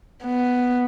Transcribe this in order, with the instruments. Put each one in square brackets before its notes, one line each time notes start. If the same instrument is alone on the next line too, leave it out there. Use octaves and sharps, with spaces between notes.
[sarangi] B3